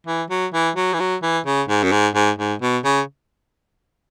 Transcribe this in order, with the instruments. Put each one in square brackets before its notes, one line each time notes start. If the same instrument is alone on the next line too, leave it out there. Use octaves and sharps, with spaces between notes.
[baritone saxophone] E3
F#3
E3
F#3
E3
F#3
E3
C#3
G#2
F#2
G#2
G#2
G#2
B2
C#3